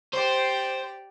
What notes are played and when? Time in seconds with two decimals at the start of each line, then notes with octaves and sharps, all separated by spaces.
0.14 G4 C5 D5